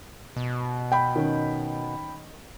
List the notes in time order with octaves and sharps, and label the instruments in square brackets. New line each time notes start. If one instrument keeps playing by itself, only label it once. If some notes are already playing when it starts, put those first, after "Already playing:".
[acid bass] B2
[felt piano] G5 B5
[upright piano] D#3 C#4